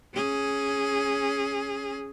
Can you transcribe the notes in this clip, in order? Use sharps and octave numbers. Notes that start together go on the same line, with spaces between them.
C#4 G#4